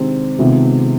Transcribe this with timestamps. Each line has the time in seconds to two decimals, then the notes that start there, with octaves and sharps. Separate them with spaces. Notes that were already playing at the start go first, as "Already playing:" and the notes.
Already playing: C3 D#3 G#3 C4 D4 G4
0.38 C3 D#3 G#3 B3 F4